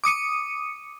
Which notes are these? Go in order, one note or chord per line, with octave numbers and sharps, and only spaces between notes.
D6 D#6 C#7 D#7